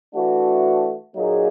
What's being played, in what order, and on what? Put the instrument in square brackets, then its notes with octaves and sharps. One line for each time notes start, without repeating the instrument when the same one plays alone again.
[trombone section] E3 A3 D4 F#4
A#2 F#3 A#3 D#4 G#4